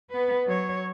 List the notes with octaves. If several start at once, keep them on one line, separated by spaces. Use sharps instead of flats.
B3 B4
F#3 C#5